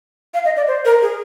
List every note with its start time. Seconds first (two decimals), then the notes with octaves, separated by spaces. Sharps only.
0.34 F5
0.45 D#5
0.57 D5
0.68 C5
0.85 A#4
1.02 G#4